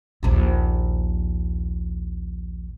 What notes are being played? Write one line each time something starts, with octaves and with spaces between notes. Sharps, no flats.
A#1 D#2